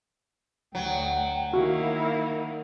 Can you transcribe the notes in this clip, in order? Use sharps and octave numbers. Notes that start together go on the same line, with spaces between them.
D2 F#3 G5
D#3 A#3 E4 F#4 F5